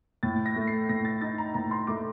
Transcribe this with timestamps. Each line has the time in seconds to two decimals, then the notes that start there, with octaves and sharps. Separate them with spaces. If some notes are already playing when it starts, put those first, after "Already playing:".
0.23 A2 A6
0.46 A#6
0.56 A3
0.67 C7
0.89 A2 A#6
1.05 A6
1.21 D#4 A6
1.38 A#5
1.54 A2 A#5
1.71 C6
1.87 A3 D6